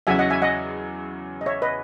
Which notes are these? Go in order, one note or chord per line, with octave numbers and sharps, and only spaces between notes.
E2 C#3 F#3 C#4 F#4 E5 G#5
D#5 F#5
E5 G#5
D#5 F#5
D#5
C#5 E5
B4 D#5